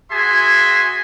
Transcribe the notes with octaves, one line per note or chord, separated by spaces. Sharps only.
F#4 G#4 E5 G#5 C6